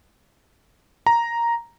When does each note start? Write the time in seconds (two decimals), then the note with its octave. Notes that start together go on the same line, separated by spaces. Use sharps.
1.06 A#5